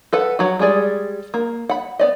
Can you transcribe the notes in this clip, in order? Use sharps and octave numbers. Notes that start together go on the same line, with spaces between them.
A4 B4 F#5
F#3 F#4
G3 G#3 G#4 D5
A#3
F#5 B5
B3 D5 D#5